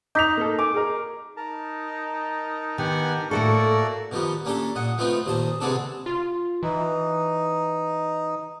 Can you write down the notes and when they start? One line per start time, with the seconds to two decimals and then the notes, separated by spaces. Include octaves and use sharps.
0.15 D#4 D6 B6 F7
0.37 A#3 A4
0.59 G#5 D6
0.74 G#4 A#4
1.37 D#4 A#4 A5 A#5
2.78 D#3 B3 G4 F#5 G#5
3.31 A2 A3 A#3 F#4 A4 D5 F#5 C#6
4.12 B2 D#3 F3 G3 B3
4.45 A#3 C#4 D4 G4 A4
4.75 A#2 D#5 F#5
4.98 F3 A3 B3 C4 D#4 F4
5.26 D#2 A#2 C5 D#5 A5
5.61 C3 G#3 B3 C4 D4 A4
6.06 F4
6.63 E3 D#4